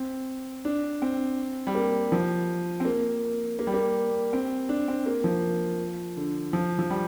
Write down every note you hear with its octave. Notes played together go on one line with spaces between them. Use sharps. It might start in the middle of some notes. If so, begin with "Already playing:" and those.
Already playing: C4
D4
C4
G3
A#3
F3
C4
A#3
A#3
G3
A#3
C4
D4
C4
A#3
F3
D3
F3
F3
G3